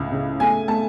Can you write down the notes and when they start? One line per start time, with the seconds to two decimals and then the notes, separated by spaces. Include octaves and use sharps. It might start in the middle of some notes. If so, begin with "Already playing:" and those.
Already playing: C#2 A2
0.12 C#3
0.40 A3 G#5
0.68 A3 A5